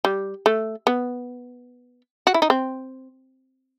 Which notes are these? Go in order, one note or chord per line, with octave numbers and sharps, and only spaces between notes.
G3
A3
B3
F#4
E4
D#4
C4